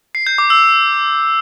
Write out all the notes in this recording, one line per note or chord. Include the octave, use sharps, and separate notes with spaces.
C7
G6
D6
E6